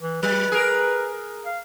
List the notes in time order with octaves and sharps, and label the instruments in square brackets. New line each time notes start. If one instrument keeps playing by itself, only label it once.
[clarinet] E3
[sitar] F#3 [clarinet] B4
[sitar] G#4 A#4
[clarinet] F5